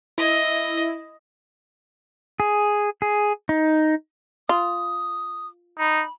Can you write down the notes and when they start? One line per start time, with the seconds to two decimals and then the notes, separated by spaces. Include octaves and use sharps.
0.18 E4 D#5
2.40 G#4
3.02 G#4
3.49 D#4
4.49 F4 D#6
5.79 D#4 B5